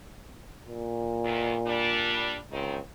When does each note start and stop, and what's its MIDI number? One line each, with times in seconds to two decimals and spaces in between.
0.68 2.39 46
1.24 1.54 40
1.24 1.54 51
1.67 2.36 55
1.67 2.36 62
2.52 2.79 37
2.52 2.77 51
2.52 2.77 60